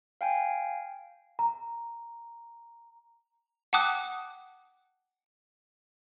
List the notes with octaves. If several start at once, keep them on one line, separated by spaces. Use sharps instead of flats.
F5 G5 G#5
A#5
F#5 G5 A5 D6 D#6 F#6